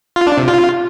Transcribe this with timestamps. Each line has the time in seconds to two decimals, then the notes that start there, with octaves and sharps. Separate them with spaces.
0.16 F4
0.27 D4
0.38 C3
0.48 F4